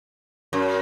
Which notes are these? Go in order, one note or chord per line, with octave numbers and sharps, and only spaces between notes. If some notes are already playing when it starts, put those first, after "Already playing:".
F#2